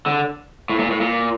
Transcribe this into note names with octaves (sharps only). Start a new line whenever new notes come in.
D3
A2
A#2
A2
A#2